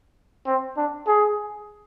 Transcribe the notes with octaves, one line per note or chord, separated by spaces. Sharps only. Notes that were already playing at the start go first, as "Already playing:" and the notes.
C4
D4
G#4